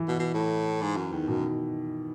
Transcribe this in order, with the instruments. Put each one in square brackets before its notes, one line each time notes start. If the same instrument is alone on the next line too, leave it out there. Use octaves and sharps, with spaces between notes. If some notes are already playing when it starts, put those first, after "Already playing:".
Already playing: [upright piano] E3
[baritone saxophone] B2
B2
A2
G#2
F#2
[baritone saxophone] E2 [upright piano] D#3
[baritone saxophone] F#2 [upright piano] B2